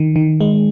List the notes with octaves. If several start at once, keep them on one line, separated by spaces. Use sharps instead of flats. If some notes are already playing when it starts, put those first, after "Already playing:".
Already playing: D#3
D#3
G#3